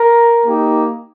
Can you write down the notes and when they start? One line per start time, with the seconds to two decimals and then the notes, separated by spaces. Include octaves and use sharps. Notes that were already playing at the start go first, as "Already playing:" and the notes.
Already playing: A#4
0.46 A#3 D#4 G4